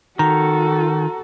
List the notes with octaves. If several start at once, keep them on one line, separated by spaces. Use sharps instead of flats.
D#3 F#4 A4 A#5